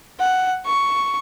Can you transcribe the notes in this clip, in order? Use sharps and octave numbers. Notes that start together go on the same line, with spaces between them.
F#5
C#6